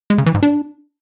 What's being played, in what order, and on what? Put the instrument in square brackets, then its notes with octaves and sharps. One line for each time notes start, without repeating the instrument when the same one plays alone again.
[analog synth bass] G#3
C#3
E3
G#2
D4